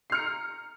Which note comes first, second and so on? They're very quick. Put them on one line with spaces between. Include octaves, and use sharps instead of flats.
C7 F6 C#7 A#5